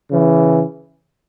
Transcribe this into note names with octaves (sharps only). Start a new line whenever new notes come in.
C#3 E3